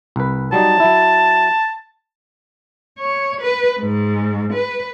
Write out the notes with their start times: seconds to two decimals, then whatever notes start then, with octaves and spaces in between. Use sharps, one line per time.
0.16 C2 B4
0.52 F#3 G3 D#4 A5
0.80 F#3 E4
2.98 C#5
3.41 B4
3.80 G#2
4.53 B4